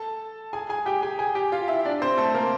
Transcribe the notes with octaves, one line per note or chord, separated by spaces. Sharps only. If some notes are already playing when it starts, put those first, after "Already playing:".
Already playing: A4 A5
G#4 G#5
G#4 G#5
G4 G5
G#4 G#5
G#4 G#5
G4 G5
F4 F5
E4 E5
D4 D5
C4 C5
A3 A4
A#3 A#4